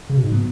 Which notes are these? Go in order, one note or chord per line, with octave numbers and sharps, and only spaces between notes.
C#3
B2
G#2
C#3 F#3 B3